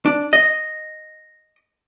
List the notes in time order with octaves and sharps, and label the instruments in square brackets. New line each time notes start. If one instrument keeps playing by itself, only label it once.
[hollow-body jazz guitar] D4
[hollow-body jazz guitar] D#5 [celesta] A#6